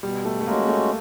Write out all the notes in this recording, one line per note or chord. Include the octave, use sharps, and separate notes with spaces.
B2 G3
A3
A3
G#3 A#3 C#4 F#4
A3